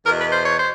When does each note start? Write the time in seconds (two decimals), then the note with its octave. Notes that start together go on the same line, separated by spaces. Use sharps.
0.04 E2 B2 A#4
0.19 B4
0.33 C5
0.45 C#5
0.57 C5